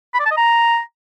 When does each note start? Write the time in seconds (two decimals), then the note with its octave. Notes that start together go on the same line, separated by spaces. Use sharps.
0.14 B5
0.20 D5
0.26 A5
0.31 D#5
0.37 A#5